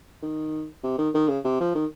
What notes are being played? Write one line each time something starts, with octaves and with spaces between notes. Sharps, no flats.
D#3
C3
D#3
D#3
C#3
C3
F3
D#3